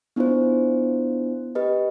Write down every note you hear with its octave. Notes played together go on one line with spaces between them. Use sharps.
B3 D4 E4 F4 C5
G4 B4 D#5